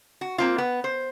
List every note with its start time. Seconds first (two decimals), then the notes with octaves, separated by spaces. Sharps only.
0.21 F#4
0.38 A#3 C4 F4
0.58 B3
0.84 C5